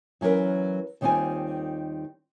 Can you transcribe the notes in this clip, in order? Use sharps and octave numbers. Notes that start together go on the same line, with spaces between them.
E3 F#3 C#4 A#4 B4
D#2 D#3 G3 C4 F4 G#5